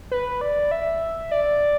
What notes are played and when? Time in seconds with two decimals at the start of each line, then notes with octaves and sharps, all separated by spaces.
0.11 B4
0.41 D5
0.71 E5
1.31 D5